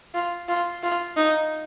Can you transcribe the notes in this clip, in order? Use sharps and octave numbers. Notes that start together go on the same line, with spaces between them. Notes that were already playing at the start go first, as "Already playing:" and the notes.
F4
F4
F4
D#4